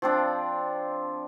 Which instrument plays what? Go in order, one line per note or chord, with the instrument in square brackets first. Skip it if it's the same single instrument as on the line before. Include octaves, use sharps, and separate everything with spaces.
[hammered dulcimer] F3 C4 D4